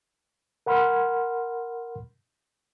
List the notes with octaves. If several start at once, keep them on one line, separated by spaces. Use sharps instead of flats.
A#4 F#5 B5 C6 F6